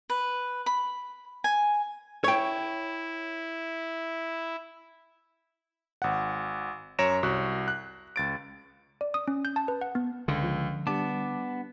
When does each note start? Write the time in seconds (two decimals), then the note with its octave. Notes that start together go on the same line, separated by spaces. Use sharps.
0.10 B4
0.66 B5
1.44 G#5
2.24 E4 C#5 G5
6.02 G#1 F#5
6.99 F#2 C#5 A#5 A#6 D7 E7
7.23 C2 F#4 F#6
7.68 F#6
8.16 C#2 A6 D7
9.01 D5
9.14 D#6
9.28 C#4
9.45 G6
9.56 A5
9.68 B4
9.81 F#5
9.95 B3
10.28 C#2 D3
10.43 F3
10.87 G3 B3 D4 A5 D6